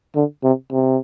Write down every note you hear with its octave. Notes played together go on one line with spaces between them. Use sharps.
D3
C3
C3